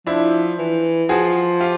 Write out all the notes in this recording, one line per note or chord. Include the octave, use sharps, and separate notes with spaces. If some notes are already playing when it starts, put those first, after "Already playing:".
F3 D4 E4
E3
F3 F#4 G#4
F4 G4